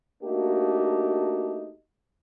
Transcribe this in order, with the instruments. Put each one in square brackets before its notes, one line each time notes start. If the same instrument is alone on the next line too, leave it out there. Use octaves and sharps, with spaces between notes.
[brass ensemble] A3 A#3 D4 D#4 F#4 G4